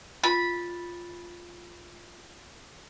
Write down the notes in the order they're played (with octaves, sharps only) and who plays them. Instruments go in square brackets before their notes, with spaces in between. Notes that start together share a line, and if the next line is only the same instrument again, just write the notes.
[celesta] F4 A6 [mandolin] B5